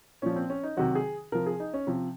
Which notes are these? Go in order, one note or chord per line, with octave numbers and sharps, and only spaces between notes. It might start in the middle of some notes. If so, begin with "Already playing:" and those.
A#2 F3 C#4
C4
C#4
D#4
C3 D#3 F#3 F#4
G#4
C3 F3 A#4
G#4
D#4
C#4
C3 F3